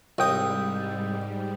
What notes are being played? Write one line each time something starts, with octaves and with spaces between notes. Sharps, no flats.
C2 G#2 G3 D#5 G5 D#6